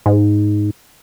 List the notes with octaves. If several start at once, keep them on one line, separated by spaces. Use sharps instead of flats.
G#2